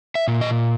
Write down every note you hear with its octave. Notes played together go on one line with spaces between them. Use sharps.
E5
A#2
D#5